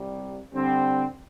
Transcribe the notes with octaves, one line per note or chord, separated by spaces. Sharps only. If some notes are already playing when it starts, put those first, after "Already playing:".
Already playing: C2 C3 G3
D3 G3 C4